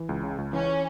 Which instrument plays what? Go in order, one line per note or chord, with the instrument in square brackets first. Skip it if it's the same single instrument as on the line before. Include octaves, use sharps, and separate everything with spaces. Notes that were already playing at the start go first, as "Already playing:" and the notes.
Already playing: [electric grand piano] E3
C#2
C#3
C#2
[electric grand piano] E3 [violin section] C#4